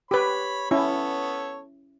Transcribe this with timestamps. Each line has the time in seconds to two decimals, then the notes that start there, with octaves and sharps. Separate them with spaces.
0.11 G4 B4 C#5 B5
0.71 B3 C#4 E4 A4 C#5